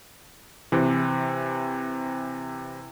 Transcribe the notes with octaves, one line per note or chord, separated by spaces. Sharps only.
C3 E3